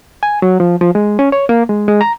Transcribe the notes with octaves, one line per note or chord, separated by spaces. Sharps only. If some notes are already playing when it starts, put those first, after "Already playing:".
G#5
F#3
F3
F3
G#3
C#4
C#5
A#3
G#3
G#3
A#5